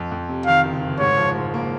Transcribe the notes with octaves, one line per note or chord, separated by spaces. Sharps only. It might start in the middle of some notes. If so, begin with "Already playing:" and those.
Already playing: F2
F2
C3
D#3 F5
F#1
F#1
G#2 C#5
F3
G#2
A#3